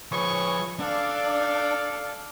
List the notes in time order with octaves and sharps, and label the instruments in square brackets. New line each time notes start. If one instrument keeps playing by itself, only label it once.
[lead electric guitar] F3 B4 [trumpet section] G#4 C#5 C#6
[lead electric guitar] D4 [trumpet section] A4 D5 F5